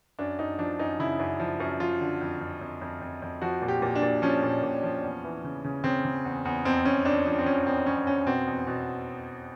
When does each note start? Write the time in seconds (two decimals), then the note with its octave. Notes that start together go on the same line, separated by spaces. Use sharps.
0.19 F#2 D4
0.39 F#2 D#4
0.59 F3 D4
0.79 F#2 D#4
1.00 C#3 E4
1.19 F#2
1.40 F3
1.60 F#2
1.80 F3 F4
2.01 D3
2.21 F2
2.41 F2
2.61 F2
2.81 F2
3.01 F2
3.22 F2
3.42 F3 F#4
3.62 A#2
3.68 G4
3.82 A#2
3.95 D4
4.02 A#2
4.22 F3 C#4
4.43 A#2
4.63 A#2
4.83 F3
5.03 E2
5.24 E3
5.44 C#3
5.64 C#3
5.84 C#3 C4
6.04 C#3
6.25 E2
6.45 E2
6.65 F2 C4
6.85 F2 C#4
7.05 F2 D4
7.26 F3 D4
7.39 C4
7.46 F3 C#4
7.66 F2 C4
7.86 F2 C#4
8.07 F2 C#4
8.26 B2 C4
8.47 E2
8.67 B2